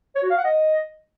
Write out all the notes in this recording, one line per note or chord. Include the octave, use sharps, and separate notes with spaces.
C#5
F#4
F5
F#5
D#5